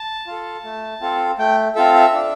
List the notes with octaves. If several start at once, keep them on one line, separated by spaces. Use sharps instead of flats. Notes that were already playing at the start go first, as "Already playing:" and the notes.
Already playing: A5
F4 A4
A3
C4 F4 A4
A3 G5
C4 F4 A4 E5
E5
D4